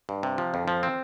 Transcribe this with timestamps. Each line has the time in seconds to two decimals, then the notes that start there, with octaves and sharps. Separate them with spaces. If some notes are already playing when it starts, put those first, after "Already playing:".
0.09 G2
0.23 C3
0.38 F3
0.54 F2
0.68 F3
0.83 C4